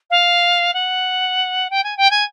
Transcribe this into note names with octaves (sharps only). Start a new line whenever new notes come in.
F5
F#5
G5
G#5
G5
G#5